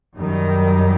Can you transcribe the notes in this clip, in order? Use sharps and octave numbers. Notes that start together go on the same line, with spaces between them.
F#2 D#3 G3